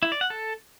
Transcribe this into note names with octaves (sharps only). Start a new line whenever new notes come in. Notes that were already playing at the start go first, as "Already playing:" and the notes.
E4
D5
F#5
A4